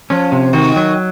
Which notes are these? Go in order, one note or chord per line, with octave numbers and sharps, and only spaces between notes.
F3 C#4
C3
D#3 F#4
F#3